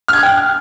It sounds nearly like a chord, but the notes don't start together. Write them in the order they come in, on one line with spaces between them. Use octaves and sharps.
F6 G#6 F#6 G5